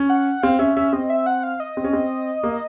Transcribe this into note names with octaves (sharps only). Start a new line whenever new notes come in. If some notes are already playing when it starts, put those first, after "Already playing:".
Already playing: C#4
F#5
C4 F5
C#4 E5
C#4 E5
C4 D#5
E5
F#5
F5
D#5
C4
C#4
C4
A#3